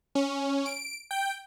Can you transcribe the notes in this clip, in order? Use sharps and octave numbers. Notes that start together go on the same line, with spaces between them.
C#4
D7
G5